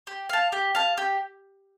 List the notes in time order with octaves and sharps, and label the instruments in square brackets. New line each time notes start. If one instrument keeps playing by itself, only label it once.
[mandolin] G4
F5 A5
G4
F5 A5
G4